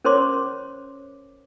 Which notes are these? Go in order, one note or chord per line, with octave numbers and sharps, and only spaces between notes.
C#4 A#4 C5 C#5 C6 D6